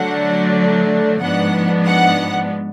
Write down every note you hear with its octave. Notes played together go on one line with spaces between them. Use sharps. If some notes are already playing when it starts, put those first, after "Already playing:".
Already playing: D3 F#3 A3 D4 F#5
G#2 F3 B3 D4 F#5
F#5